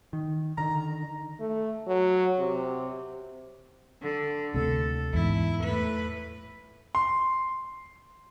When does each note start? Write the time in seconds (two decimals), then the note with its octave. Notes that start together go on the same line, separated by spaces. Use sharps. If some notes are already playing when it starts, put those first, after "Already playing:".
0.13 D#3
0.58 D3 D#3 A#5
1.40 A3
1.88 F#3
2.39 C3
4.02 D3
4.54 D2 C3 A4
5.14 E2 G#2 E4
5.64 A2 B4
6.95 C6